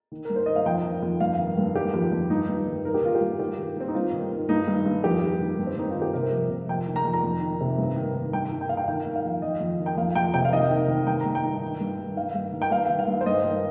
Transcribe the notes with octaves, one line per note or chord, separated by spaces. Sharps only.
D#3
G2 A#4
C5
D#3 D#5
F5
F2 G5
D#3
F2
G2 F5
D#3
G2
D#3 G4
F2
F2
G2 D#4
G2
D#3
D#3 A#4
G4
D#3 F4
G4
G2
D#3 G4
D#3
D#3 C4
D#4
G2 F4
D#3
D#3
G2 D#4
G2
G2
F2 G4
D#3
D#3
G2
C4
D#3 D#4
F4
D#3
G4
C3 A#4
F2
C3
F2 G5
D#3
A#5
F2
A#5
F2
D#3
C3
G2
D#3
D#3
G2 G5
D#3
G5
D#3 F5
G5
D#3 G5
D#3
F5
F2
F2 D#5
F2
D#3
G5
F2 F5
F2 G5
C3 G5
F5
D#3 D#5
D#3
D#3
G2 G5
A#5
G2
G5
D#3
D#3
G2
D#3
D#3 F5
G2
D#3
G5
G2 F5
D#3
F5
G2
C5
G2 D#5
D#3